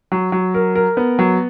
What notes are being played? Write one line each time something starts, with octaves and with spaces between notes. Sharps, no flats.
F#3
F#3
A#4
A#4
B3
F#3